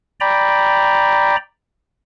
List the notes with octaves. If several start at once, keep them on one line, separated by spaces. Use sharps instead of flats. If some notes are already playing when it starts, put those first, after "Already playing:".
D5 G5 A#5 B5